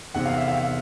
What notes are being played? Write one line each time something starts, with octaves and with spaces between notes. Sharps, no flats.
E2 C3 D#3 F#5
F5
E5
F5